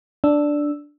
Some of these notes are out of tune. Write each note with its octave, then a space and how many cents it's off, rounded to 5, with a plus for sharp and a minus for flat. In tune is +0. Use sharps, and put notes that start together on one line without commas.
D4 +0 E6 +0